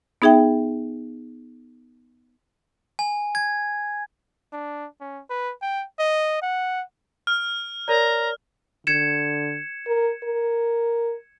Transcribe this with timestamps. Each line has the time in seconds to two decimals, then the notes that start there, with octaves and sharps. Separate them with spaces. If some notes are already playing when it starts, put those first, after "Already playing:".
0.22 B3 D#4 G#4 E5 G5
2.99 G#5
3.35 G#6
4.53 D4
5.01 C#4
5.30 B4
5.62 G5
5.99 D#5
6.42 F#5
7.27 F6
7.88 A#4 C#5 D5 A#5
8.87 D3 G#6 C#7 E7
9.87 A#4
10.24 A#4